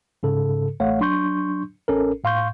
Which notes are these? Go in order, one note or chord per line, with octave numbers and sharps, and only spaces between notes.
G#2 C#3 A4
A1 A3 C#5 F5 F#5
F#3 D4 C6 C#6 G6
A1 C#4 A4 A#4
A2 F5 C6 C#6 G6